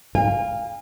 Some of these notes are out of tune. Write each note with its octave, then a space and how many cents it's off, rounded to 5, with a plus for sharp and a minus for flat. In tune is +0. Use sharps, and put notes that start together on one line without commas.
F5 +0 G#5 -40